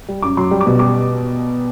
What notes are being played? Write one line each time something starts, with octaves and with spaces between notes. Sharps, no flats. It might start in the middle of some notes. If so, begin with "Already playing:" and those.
G3
F#2 D6
F#3 C6
G3
D6
B2
G3 D6